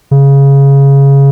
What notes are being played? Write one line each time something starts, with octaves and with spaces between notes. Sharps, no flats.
C#3